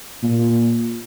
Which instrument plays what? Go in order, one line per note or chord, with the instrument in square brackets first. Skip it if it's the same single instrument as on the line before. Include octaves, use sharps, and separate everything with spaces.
[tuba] A#2